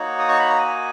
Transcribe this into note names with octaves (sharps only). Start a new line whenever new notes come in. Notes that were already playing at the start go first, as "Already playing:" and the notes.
Already playing: A#3 D#4 F#4 C#5
D#6
C#6
B5
A#5
G#5